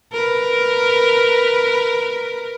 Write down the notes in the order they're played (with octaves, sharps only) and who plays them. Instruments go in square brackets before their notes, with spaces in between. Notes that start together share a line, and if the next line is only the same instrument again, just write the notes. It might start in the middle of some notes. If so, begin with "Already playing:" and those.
[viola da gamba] A#4 B4